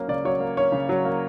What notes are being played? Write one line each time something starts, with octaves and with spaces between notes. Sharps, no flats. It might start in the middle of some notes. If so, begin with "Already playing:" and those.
Already playing: F#3 A#3 C#4
C#3 D5
F#3 C#5
A#3
C#4 C#5
C#3
F#3
A#3